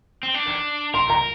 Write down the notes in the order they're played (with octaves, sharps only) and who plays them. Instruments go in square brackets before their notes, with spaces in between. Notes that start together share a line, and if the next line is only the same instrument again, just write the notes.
[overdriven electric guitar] C4
D4
[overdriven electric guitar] A#4 [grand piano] C6
[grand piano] A#5